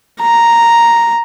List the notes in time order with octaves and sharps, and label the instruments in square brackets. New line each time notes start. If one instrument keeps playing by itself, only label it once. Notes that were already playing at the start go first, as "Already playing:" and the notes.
[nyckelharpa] A#5